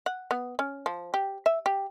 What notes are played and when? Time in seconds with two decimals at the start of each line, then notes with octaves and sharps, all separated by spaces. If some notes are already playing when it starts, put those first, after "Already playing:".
0.06 F#5
0.31 B3
0.59 C#4
0.86 F3
1.14 G4
1.46 E5
1.66 G4